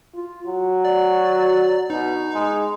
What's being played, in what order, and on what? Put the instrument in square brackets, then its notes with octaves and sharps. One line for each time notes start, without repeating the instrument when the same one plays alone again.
[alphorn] F4
[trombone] F#3 [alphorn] F#4
[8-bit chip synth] D5
[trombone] B2 [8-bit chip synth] D#4
[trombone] G#3 [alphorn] G#4